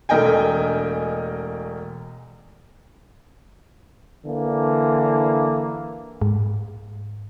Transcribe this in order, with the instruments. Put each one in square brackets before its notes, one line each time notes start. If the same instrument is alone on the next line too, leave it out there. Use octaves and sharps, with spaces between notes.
[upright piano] E1 A3 A#4 D#5 G5 G#5
[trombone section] D3 E3 A#3
[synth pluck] G#2